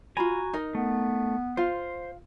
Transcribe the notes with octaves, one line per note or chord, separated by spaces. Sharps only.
F4 F#4 G#5 A#5 B5
D#4 A#4 D#5
A3 B3
F4 C5 F5